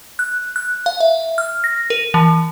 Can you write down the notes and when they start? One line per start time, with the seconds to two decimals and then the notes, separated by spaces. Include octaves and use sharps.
0.19 F#6
0.56 F#6
0.86 F5
1.00 E5
1.38 F6
1.64 A#6
1.90 A#4
2.14 E3